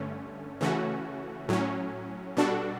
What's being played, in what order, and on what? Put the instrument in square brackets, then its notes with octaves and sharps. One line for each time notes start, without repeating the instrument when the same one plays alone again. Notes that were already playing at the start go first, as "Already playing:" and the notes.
Already playing: [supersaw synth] G2 D3 A3 C#4
C#3 E3 A3 C#4 F#4
A2 F#3 C#4
B2 G3 D4 F#4 A4